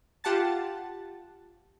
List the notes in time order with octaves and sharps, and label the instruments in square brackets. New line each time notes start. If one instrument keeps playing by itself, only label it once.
[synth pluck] F4 G4 F#5 A5 A6